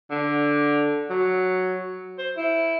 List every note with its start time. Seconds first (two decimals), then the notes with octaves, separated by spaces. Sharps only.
0.11 D3
1.10 F#3
2.18 C5
2.37 E4